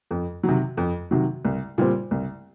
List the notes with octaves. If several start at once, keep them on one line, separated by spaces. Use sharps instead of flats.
F2
C3 D#3 F#3
F2
C3 D#3 F#3
C2
A#2 G3 C4
C2